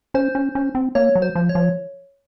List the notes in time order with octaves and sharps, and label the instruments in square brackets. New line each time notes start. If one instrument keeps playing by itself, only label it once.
[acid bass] C#4 [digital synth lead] C5
[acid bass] C#4
C#4
C4
[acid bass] A#3 [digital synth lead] C#5
[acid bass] F#3
[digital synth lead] C5
[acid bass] F3
[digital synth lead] C#5
[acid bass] F3